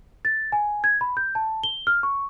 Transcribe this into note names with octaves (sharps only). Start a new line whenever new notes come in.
A6
G#5
G#6
B5
G6
A5
G7
F6
C#6